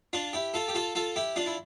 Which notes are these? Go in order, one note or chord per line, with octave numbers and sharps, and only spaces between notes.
D4 F4
E4 G4
F4 A4
G4
F4 A4
F4 A4
E4 G4
D4 F4
E4